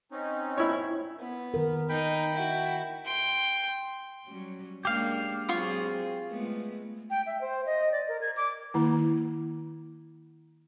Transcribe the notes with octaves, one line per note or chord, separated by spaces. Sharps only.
C4 C#4 D#4
E4 C#5
B3
D#3 A#4
D#4 G5 B5
E4 F#4
G5 C6
F#3 G3 C#4
G#3 A#3 D4 G4 F5
F#3 C4 F4 G#4 C#6
G#3 A3 B3
G5
E5
C5
D#5
D5
A#4
G#6
D6
D#3 A#3 E4